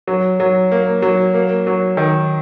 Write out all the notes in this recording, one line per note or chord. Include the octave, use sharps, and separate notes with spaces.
F#3
F#3
A#3
F#3
A#3
F#3
D#3